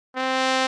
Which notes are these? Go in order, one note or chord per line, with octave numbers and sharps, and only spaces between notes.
C4